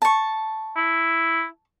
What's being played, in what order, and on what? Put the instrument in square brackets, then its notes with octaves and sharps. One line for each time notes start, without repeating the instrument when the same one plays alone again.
[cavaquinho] A5 C#6
[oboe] E4